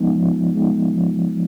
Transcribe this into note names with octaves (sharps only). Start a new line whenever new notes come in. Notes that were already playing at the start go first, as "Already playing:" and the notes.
Already playing: F3 G#3 B3 D#4
F3
G#3 B3 D#4
F3